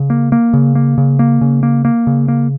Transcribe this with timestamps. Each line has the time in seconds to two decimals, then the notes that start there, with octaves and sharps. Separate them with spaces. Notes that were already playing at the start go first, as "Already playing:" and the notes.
Already playing: C#3
0.10 A#3
0.32 A#3
0.53 C#3
0.75 A#3
0.98 C#3
1.19 A#3
1.41 C#3
1.63 A#3
1.85 A#3
2.07 C#3
2.28 A#3